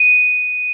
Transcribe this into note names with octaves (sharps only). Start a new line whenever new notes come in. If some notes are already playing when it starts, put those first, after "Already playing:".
Already playing: D#7